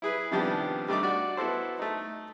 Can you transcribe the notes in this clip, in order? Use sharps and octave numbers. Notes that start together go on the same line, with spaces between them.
E4 G#4 B4
C3 D#3 F3 G3 B3 D4
G3 A3 D4 D#4 D6
F#4 D5
B3 E4 F#4 A4 C5
A3 D#4